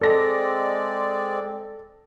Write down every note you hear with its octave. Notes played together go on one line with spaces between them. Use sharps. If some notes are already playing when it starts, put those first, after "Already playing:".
G#3 C4 A4 D5 A#6